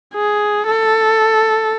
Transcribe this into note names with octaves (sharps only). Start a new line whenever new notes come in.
G#4
A4